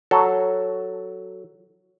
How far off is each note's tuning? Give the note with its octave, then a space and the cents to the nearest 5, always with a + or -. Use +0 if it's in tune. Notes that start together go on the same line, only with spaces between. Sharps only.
F#3 +0 A4 +0